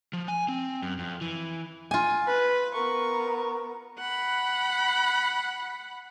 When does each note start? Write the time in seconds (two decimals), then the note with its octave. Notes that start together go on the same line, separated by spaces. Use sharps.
0.13 F3
0.28 G#5
0.48 C4
0.82 F#2
0.99 F2
1.21 E3
1.91 F4 G#5
2.27 B4
2.74 B3 A#4 C#6
4.00 F#5 B5